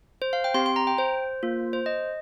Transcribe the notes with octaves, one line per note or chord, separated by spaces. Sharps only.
C5
F5
G5
C4 G4 C6
C6
A#5
G5
C5
A#3 F4
C5
D#5